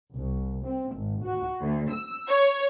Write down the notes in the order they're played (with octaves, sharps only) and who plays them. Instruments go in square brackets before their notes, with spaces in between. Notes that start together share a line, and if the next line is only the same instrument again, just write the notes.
[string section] C2
C4
G#1
F#4
D2
E6
C#5